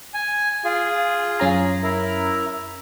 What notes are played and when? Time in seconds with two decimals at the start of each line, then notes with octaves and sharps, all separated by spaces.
0.14 G#5
0.65 F4 G#4
1.40 F#2 C#4 A#5
1.83 E4 A#4